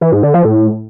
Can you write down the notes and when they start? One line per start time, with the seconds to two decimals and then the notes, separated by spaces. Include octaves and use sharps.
0.01 E3
0.12 G#2
0.23 D3
0.34 F3
0.45 A2